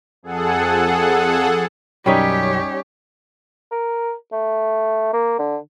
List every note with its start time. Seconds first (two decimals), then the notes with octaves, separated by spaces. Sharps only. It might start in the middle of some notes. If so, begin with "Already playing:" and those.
0.23 F2 G#4 A4 F#5
2.06 B1 F#2 G3 C#4 D#4 G4 C#5 B6
3.71 A#4
4.32 A3
5.13 A#3
5.39 D3